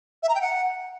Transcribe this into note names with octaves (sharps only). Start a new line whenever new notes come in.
E5
A#5
G5
F#5